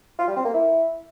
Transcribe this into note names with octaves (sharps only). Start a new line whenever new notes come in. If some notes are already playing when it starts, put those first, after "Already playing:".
F4
G3
C4
A#3
E4